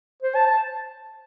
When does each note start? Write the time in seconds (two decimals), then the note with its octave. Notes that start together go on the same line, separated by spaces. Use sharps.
0.23 C5
0.35 A5
0.47 A5